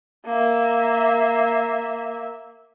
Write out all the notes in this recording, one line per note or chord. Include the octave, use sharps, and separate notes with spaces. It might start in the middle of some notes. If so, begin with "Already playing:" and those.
A#3 E5